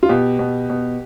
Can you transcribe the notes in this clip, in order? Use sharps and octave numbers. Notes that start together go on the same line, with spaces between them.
F4
B2 G4
B2
B2